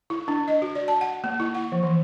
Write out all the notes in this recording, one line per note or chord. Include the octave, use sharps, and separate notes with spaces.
E4
D4
D#5
F#4
D5
A5
F#5
A#3
E4
F#5
F3
E3